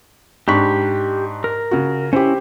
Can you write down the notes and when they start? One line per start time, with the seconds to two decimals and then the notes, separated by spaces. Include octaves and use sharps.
0.48 G#2 D4 G4 B5 C#6
1.44 A#4
1.71 C#3 F#4
2.13 C#4 E4 G4 C5